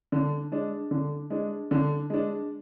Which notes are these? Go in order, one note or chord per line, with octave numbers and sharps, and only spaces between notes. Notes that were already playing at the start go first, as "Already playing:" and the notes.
D3
G#3 D4
D3
G#3 D4
D3
G#3 D4